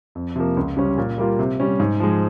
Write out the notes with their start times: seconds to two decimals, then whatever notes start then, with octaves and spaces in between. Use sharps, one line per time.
0.15 F2
0.36 C3 F3 A#3
0.57 C#2
0.77 C#3 G3 C#4
0.98 A#2
1.18 G3 A#3 F4
1.39 C3
1.60 G3 C#4
1.80 G#2
2.00 F3 G#3